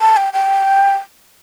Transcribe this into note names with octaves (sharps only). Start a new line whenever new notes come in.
A5
G5
G5